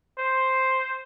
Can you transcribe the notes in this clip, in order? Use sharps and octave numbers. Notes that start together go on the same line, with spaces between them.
C5